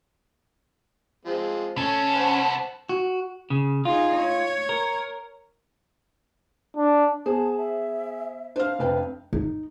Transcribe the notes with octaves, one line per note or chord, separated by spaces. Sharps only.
F3 G#3 C4
C2 A3 C#4 A4
C5 F#5 B5
F#4
C#3
D#4 F4 G#4
C#5
A#4
D4
B3 G#4 C5 A5
E5
D4 C5 F5 F6
F1 B4 G5
D#4